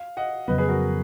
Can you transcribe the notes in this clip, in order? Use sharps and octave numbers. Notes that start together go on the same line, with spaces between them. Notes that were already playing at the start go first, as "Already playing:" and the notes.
Already playing: F5
D#5 F#5
F2 C#3 F#3 B3 B4 D#5
G#4 B4
F#4 A#4